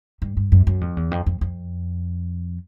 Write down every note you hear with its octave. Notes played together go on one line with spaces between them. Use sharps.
G2
G2
F#2
F#2
F2
E2
F2
F2
F2